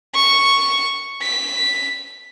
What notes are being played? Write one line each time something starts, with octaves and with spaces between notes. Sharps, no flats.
C#6
B6